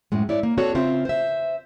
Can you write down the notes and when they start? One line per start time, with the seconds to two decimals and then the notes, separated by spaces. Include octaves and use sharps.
0.12 F#2 A2 G#3
0.29 E4 C#5 D5
0.43 A#3
0.57 C4 D4 F#4 A4 C#5
0.75 C#3 C4 F4 E5
1.05 C5 E5